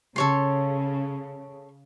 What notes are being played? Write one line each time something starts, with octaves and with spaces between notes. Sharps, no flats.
C#3 A4 C#5 C6